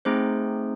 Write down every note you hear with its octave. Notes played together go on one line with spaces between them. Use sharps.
A3 C4 D#4 G#4 C5